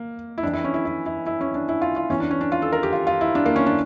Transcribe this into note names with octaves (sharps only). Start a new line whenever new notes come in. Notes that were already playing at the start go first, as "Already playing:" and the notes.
Already playing: A#3
E4
F2 E3 D4
E4
C#4
E4
E4
E4
E4
C#4
D4
E4
F4
F4
E2 E3 C#4
D4
C#4
D4
F4
A4
A#4
G4
F4
F4
E4
D4
A#3
C#4
D4